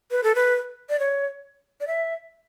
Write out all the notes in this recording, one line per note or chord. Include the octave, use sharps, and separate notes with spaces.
B4
A4
B4
D5
C#5
D5
E5